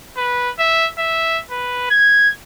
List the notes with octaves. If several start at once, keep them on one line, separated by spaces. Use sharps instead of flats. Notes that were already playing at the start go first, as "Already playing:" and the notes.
B4
E5
E5
B4
G#6